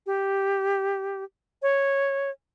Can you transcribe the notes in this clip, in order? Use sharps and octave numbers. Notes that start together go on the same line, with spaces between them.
G4
C#5